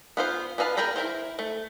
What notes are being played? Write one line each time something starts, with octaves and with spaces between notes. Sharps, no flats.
B3 F4 C5
B3 D4 B4 F5 A5
G#4 A#4 G5 A#5 B5
E4 F4 A#4 C5
A3